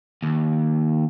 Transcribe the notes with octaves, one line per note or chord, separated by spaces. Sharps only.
D#2